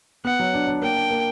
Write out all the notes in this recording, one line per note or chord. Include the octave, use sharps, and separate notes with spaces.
B3 F#5
F#3
D4
D4
A#3 G5
D4
A#3